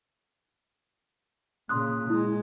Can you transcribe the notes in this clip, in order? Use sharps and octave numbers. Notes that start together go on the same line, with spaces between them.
A#2 C#3 C6 D#6 F#6
G#3 E4